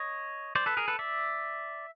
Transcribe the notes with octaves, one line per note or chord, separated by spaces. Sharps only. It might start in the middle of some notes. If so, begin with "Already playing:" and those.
Already playing: C#5 D#5
C5 D5
A4 B4
G#4 A#4
A4 B4
D5 E5